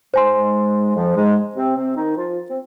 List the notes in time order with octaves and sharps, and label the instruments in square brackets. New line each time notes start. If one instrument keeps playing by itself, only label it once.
[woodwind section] G#2 G#3 [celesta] C5 G#5 C6
[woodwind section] F2 F3
G#2 G#3
C3 C4
C3 C4
D#3 D#4
F3 F4
C4